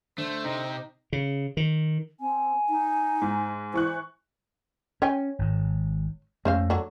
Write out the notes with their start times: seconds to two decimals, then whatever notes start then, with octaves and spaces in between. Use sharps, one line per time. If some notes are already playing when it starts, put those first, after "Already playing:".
0.18 D3 A3 C5
0.44 C3 D#4
1.13 C#3
1.57 D#3
2.20 C4 G#5
2.70 D#4
3.22 G#2
3.74 E3 C5 C#6 F#6
5.02 C#4 C#5 G5 G#5
5.39 G#1 G#2
6.45 F2 A3 A#3 C#4 C5 F5
6.70 D3 F#3